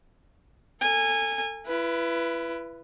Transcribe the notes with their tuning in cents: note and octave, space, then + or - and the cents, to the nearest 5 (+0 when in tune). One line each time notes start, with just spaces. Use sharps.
A4 +30 G#5 -20
E4 +35 B4 +0